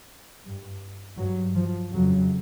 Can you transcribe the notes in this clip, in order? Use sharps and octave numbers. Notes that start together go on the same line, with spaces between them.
G2
G2 F#3
F3
F2 C#3 F#3